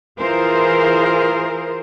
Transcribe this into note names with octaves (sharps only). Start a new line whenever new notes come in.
E3 F4 G#4 A#4 C5